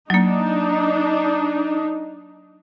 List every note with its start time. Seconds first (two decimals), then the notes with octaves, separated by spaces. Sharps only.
0.10 F#3 A#3 D4 D#4